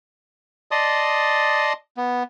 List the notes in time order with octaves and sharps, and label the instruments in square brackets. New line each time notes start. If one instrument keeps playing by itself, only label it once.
[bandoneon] D5 D#5 A5 C6 D#6
B3